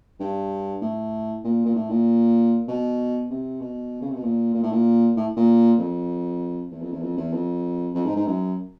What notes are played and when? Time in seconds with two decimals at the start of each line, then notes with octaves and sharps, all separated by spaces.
0.20 G2
0.81 A2
1.44 A#2
1.65 A#2
1.75 A2
1.90 A#2
2.68 B2
3.30 C3
3.61 B2
4.02 C#3
4.09 C3
4.16 B2
4.23 A#2
4.54 A#2
4.63 A2
4.72 A#2
5.17 A2
5.36 A#2
5.79 F2
6.71 E2
6.81 F2
6.92 E2
7.02 F2
7.17 E2
7.33 F2
7.95 F2
8.05 G#2
8.16 G#2
8.27 F#2